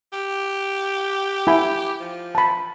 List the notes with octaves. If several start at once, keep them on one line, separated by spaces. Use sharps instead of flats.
G4
E4 G#5 B5
F3
A5 B5